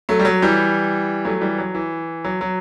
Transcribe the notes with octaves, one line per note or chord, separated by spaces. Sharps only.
F#3 A3
G3
F#3
E3 G3
F#3 A3
E3 G3
F#3
E3
F#3
F#3